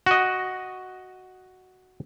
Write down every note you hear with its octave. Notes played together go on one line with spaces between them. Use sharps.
F#4 D#5